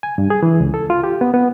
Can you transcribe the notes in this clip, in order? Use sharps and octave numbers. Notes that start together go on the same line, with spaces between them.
G#5
G2
G#4
E3
C#2
A4
F4
G4
B3
B3